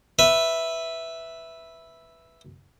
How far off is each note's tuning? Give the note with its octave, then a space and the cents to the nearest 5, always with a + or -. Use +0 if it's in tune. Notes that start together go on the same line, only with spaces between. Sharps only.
B4 +0 E5 +0